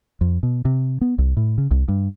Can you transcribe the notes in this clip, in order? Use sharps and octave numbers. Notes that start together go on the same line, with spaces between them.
F2
B2
C3
B3
C2
A2
C#3
C2
G2